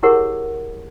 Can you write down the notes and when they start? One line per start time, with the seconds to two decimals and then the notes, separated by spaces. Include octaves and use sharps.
0.03 E4 G4 G#4 A#4 C#5 F#5